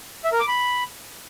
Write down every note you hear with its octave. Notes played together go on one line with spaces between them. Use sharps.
E5
A#4
D6
B5